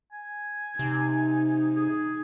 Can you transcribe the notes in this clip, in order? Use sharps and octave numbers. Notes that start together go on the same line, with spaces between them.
G#5
C3 D#4
G#4